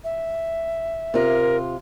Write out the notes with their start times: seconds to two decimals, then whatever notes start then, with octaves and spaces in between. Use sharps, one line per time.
0.04 E5
1.14 C3 F4 A#4